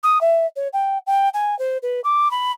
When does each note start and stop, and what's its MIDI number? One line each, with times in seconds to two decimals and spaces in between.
0.03 0.21 87
0.21 0.46 76
0.56 0.68 73
0.73 0.98 79
1.07 1.29 79
1.34 1.57 80
1.59 1.78 72
1.82 2.01 71
2.04 2.31 86
2.31 2.52 83